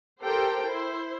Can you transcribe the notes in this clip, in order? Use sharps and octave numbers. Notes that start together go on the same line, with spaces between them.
G4 A4 A#4 C5 G5
E4 C5